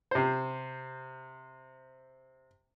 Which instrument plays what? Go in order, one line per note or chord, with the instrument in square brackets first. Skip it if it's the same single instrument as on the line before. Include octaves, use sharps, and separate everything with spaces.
[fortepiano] C3 C5